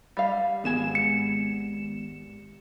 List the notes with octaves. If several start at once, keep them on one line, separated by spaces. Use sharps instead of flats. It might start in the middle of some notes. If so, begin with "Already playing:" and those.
G3 F5
G#1 G#3 B3 G#5 E7
C#7